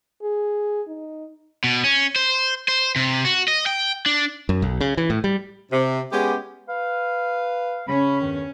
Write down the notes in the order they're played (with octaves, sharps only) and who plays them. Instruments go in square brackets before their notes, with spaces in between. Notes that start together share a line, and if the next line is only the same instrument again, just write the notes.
[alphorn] G#4
D#4
[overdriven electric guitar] B2
C#4
C5
C5
C3
F#4
D#5
G5
D4
[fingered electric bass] F#2
B1
C#3
E3
A2
G3
[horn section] C3
G#3 B3 C#4 G4
[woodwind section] B4 F5
[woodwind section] C#3 B5 [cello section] C#4
[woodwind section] E2 G2 D#3